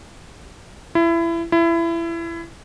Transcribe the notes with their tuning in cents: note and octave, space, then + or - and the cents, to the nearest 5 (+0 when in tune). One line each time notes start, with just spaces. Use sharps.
E4 +25
E4 +25